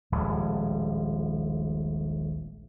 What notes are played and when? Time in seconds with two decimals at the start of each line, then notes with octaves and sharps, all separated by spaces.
0.12 D#1 A#1 A2 G#3